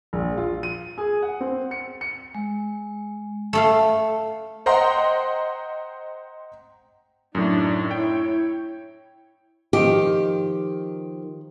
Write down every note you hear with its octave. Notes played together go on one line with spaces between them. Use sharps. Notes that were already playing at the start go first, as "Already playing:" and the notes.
A#1
F4
D#7
G#4
F#5
C4
C#7
C#7
G#3
A3 A4 F5
C5 D#5 F#5 G5 A#5 C6
F#2 A2 D4 D#4
E4 C#5 G5
D#3 F3 G4